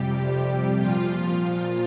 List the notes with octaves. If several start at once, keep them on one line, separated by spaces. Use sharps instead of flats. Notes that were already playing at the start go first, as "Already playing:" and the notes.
Already playing: F2 C3 G3 G4
A#2 F3 F4